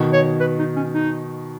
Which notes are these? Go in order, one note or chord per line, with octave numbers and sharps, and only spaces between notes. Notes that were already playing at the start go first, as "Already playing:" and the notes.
Already playing: B2 D#3
C#5
B4
D#4
C#4
D#4